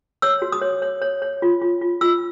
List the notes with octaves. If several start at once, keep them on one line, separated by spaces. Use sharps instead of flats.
C#5 E6
F#4
D#6
C#5
C#5
C#5
C#5
F4
F4
F4
F4 E6